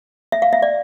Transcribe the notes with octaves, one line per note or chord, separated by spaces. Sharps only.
E5
F5
E5
D5